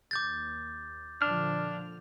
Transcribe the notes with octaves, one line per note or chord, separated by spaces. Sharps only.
D#2 D6 G6 A6
A#2 D3 F3 D4 F6